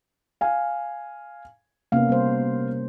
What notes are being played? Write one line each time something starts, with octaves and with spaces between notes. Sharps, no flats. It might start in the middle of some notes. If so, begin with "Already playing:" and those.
F5 G#5
C3 A#3 B3 C#4 F5
G3 C5